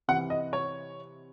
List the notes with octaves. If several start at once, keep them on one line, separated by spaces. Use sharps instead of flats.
C3 E3 F#5
D#5
C#5